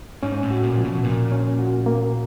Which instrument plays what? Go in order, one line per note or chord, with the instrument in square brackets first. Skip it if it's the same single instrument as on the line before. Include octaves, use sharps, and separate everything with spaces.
[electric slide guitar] G#2 [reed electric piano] C#4
[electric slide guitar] A2
[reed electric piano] F#4
[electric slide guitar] A#2
[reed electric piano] F3
[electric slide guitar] B2
[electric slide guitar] A#2 [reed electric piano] A#3
[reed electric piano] C#4
F#4
A#3